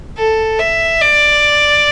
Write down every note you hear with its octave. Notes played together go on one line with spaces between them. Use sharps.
A4
E5
D5